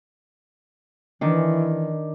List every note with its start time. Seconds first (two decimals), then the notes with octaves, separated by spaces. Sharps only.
1.21 D#3 E3 D4